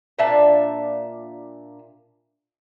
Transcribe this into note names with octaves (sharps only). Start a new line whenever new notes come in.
A#2 D4 E5 A5